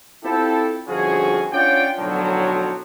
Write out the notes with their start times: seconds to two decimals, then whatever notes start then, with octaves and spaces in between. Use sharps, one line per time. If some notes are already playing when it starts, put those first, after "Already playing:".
0.24 C4 E4 F4 G4 A4
0.88 G1 F2 F3 C#4 F#4 G#4
1.53 C#4 D4 F4 D5 F#5 G5
1.99 B1 A2 D3 F3 F#3